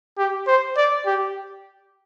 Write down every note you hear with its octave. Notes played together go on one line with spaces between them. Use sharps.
G4
C5
D5
G4